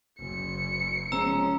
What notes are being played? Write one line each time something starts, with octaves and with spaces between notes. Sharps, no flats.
F#1 C#7
F3 G#3 C#4 A#5 E6